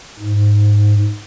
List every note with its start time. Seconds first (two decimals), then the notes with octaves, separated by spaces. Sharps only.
0.19 G#2